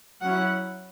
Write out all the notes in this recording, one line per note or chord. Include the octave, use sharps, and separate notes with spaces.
F#3 C#4 E4 F#5